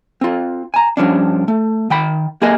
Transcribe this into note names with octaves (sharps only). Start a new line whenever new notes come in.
C4 F4
G#5 A#5
G2 F3 C#4 D4
A3
D#3 G5 B5
A#3 G4 G#4 A#4 D#5 G#5